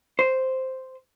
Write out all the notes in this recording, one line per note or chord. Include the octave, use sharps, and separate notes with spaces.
C5